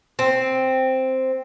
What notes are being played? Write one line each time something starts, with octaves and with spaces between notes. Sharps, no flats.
C4